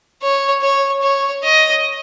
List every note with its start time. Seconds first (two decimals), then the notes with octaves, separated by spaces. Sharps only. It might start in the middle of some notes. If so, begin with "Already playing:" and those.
0.22 C#5
0.63 C#5
1.03 C#5
1.44 D#5